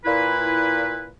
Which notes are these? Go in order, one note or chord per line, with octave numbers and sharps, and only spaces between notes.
A#2 E4 B4